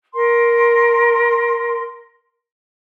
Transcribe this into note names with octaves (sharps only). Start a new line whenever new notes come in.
A#4 C6